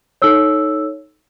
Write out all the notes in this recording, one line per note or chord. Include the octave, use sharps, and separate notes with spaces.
D#4 A4 C#5 E6